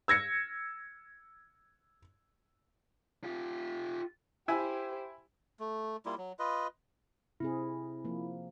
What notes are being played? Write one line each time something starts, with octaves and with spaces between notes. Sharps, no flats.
E6 G#6 A#6 C#7
F4 G4
E4 G4 C5 E5 G#5
A3
G3 A#3 E4 F4
F#3
F4 B4 D#5
C3 C4 E4 G#4
F3 A#3